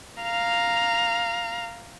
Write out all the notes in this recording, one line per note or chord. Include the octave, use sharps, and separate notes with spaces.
F5 A#5